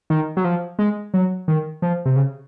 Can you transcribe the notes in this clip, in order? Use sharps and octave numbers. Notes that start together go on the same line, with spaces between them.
D#3
F#3
F3
G#3
F#3
D#3
F3
C3
C#3